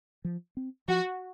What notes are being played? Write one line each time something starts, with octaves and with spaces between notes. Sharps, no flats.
F3
C4
F3 F#4